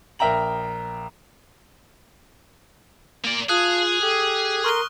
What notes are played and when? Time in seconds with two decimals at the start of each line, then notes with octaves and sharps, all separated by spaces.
0.19 A#1 A#4 E5 G5 A#5 F#7
3.25 A#3 D5
3.49 F4 G#4 F5 A5 D#6 F#6
4.01 G4 A4
4.64 A#4 C6 C#6 F6 G7